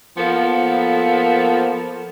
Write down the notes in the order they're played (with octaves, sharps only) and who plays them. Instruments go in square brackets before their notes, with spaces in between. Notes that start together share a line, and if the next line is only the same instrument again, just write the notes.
[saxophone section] F3 A#3 B3 A4